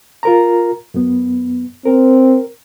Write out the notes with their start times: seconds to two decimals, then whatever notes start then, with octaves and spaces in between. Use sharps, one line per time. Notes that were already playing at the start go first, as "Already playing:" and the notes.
0.23 F4 A#4 A#5
0.94 F#2 B3
1.86 C4 A#4